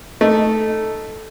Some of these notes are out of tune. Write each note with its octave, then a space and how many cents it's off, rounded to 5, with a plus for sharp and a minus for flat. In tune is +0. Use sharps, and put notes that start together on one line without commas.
A3 +0 D#4 +0